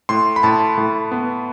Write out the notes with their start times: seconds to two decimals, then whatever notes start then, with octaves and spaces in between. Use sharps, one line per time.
0.09 A2 C6
0.36 B5
0.43 A2 A5
0.78 A2
1.11 B3